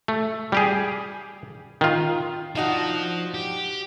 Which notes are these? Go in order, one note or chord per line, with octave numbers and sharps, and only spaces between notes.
A3
G3 G4 G#4
D#3 F4
F3 D4 D#4 F#4
G4